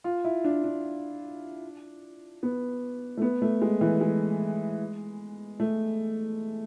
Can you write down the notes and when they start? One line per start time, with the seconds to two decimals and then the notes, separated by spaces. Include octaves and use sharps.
0.04 F4
0.25 E4
0.44 D4
0.64 D4
2.43 B3
3.17 A3
3.22 B3
3.42 A3
3.62 G#3
3.81 E3
4.01 G#3
5.60 A3